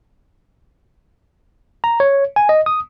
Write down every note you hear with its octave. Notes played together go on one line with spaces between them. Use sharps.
A#5
C#5
G#5
D#5
D#6